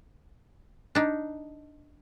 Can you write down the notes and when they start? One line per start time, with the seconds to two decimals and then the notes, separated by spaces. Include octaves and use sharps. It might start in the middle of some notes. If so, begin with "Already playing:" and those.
0.95 D4 D#4